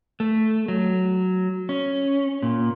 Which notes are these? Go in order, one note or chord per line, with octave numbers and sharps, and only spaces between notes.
A3
F#3
C#4
A#2